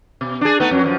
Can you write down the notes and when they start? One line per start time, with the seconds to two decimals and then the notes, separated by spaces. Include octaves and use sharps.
0.21 B2
0.41 D4 G#4
0.60 A3 B3 D#4
0.71 F2 F#3
0.84 F#2 F3